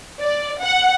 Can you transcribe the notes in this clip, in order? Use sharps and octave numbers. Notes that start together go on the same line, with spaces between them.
D5
F#5